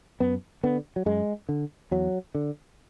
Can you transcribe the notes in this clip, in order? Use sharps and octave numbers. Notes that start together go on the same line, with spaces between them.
F#2 B3
D3 B3
F#3
F#2 G#3
D3
E2 F#3
D3